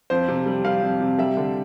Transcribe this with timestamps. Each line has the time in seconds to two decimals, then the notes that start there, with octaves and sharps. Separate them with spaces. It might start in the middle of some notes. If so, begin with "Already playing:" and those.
0.10 F2 C5
0.28 C3
0.46 G3
0.65 G3 F5
0.82 F2
1.01 C3
1.19 G3 E5
1.37 D3